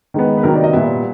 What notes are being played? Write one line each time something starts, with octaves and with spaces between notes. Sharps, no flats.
D#3 G#3 B3
B4
C3 D#3 F#3 A#3 A#4
D5
D#5
A#2 G3 B3 E5